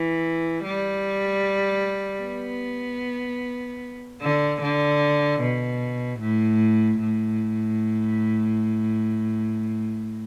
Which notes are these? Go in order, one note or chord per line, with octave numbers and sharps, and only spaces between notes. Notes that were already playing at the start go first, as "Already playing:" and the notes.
Already playing: E3
G3
B3
D3
D3
B2
A2
A2